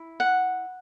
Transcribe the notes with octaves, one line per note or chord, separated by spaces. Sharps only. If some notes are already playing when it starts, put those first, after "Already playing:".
Already playing: E4
F#5